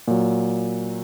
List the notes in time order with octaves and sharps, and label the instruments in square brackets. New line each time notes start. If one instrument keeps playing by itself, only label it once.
[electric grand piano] A#2 F#3